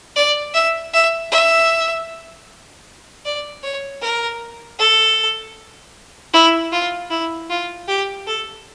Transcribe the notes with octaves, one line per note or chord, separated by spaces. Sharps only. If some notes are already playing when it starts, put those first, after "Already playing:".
D5
E5
E5
E5
D5
C#5
A#4
A4
E4
F4
E4
F4
G4
A4